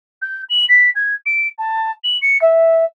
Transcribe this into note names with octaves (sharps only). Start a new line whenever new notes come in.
G6
F#7
B6
G#6
D7
A5
F#7
C#7
E5